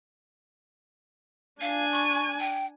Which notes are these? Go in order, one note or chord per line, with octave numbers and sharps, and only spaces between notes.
D4 F5 G#5
C#6
G5